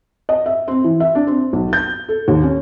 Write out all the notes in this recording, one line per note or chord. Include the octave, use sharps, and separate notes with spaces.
D#5
E5
C4
E3
E5
D4
C4
B1
G6
A4
D#2
C#4